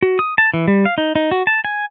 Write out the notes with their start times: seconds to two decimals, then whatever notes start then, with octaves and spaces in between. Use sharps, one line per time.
0.02 F#4
0.19 D#6
0.38 A5
0.54 E3
0.68 G3
0.85 F5
0.98 D#4
1.15 D#4
1.31 F#4
1.47 A5
1.65 G#5